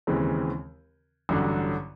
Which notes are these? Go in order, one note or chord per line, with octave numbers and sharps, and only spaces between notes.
D#2 C#3 E3 G#3 C4
A1 G2 D3 F#3